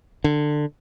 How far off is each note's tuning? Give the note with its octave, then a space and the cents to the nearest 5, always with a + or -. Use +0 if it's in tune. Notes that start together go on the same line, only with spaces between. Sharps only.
D3 +20